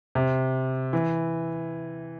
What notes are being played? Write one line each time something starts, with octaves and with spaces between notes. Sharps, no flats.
C3
E3